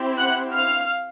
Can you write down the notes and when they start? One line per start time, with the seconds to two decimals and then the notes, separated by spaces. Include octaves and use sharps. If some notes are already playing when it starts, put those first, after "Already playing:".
Already playing: C4 E4 G4
0.18 F#5 F#6
0.53 F5 F6